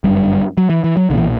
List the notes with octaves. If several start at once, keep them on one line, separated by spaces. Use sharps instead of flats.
G1 F#2 D3 G3
F#3
E3
E3
F#3
B1 A#2 D3 E3